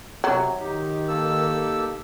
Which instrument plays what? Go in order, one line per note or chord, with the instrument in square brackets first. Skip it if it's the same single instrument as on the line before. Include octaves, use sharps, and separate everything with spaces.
[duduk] C3 [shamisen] F#3
[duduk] D#3 [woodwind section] D#4 G4
[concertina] A#3 A4 E6